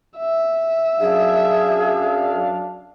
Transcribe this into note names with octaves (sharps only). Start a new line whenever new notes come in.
E5
F#2 D4 G#4 F5